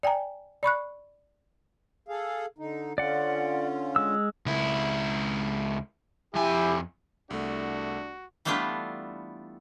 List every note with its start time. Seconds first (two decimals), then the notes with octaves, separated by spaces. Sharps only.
0.03 D5 G5 G#5 A#5
0.63 D5 B5 C#6 F#6
2.08 G#4 A4 F5
2.58 D3 D#4
2.98 D3 C#4 F4 D5 F#5
3.96 G#3 E6
4.46 C#2 E4
6.35 F2 E4 G4 G#5
7.30 C2 A3 D4 F#4
8.45 E3 G3 A3 B3 D4 F4